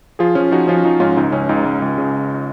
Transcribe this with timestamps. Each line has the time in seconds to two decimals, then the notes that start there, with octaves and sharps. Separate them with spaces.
0.19 F3 F4 G#4
0.35 F3 C#4 F4
0.51 F3 D#4 F#4
0.68 F3 C#4 F4
0.84 F3 D#4
1.00 G#2 C#4 F4
1.17 C#2 D#4
1.32 C#2 C#4
1.49 C#2 D#4
1.65 C#2
1.82 C#2
1.98 C#3